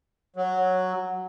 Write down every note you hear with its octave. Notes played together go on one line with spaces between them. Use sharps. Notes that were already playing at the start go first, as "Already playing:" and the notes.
F#3